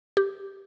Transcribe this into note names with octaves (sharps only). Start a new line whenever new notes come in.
G4